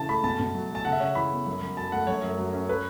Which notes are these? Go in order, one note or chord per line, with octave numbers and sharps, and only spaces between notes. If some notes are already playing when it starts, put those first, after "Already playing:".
Already playing: C#3 E3 C#4 A5
A3 B5
B2 A5
B2
F#3
A3
A5
C#3 F#5
E5
C#3 C#5
E3 B5
B3
F#2
F#2
F#3 A5
A3 F#5
F#2 C#5
F#2
F#3
C#4
B4